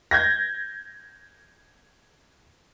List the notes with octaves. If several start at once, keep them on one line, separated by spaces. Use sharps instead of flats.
G6 G#6 A#6